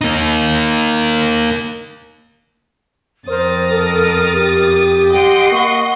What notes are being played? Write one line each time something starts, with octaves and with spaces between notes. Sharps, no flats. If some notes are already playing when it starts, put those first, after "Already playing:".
A#3 D#4
F2 A#4 C5 D#6 A6
A4
G4
D#5 F#5 G5 C6
A#3 C#6